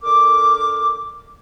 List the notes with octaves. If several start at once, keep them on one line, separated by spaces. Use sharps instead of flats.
D3 A#4 D6